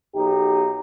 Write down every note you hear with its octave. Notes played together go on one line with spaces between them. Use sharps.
B1 D#4 G4